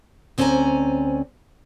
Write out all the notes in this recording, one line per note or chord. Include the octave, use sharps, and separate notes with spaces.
D2 C4 C#4 D5 G#5 A#5